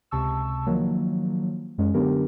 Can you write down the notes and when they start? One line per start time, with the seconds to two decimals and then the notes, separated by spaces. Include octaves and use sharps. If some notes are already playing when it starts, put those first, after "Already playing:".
0.11 C#2 C3 A5 C#6 E6
0.66 D#3 F3 F#3 A#3
1.78 F#2 G#3 C#4
1.94 D3 F#3 B3 D4 G4 A#4